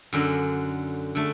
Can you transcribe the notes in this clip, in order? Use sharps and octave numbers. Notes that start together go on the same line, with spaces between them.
F#2 D3 F#3
D3 A3